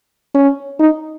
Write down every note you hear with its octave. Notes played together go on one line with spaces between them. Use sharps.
C#4
D#4